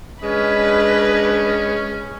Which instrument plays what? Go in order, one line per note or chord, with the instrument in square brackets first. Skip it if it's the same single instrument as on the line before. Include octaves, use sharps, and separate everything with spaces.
[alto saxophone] G#3 [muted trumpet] C#4 [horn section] D4 D#5 [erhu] B4